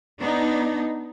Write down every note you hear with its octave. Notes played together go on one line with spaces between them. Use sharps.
B3 D4 D#4